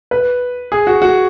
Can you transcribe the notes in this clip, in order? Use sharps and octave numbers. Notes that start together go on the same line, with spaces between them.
B4
G#4
F#4
F#4